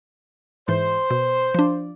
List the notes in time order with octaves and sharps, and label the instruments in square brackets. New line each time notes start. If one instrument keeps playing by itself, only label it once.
[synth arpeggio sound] G#2 E3 [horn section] C5
[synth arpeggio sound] B2
F3 D4